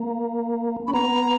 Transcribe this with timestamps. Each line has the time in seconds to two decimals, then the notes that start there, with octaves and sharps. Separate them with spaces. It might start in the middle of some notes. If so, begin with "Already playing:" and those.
Already playing: A#3
0.87 C#4 B5
0.93 B3 A#5